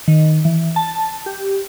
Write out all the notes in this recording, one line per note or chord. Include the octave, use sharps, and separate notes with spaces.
D#3
E3
A5
G4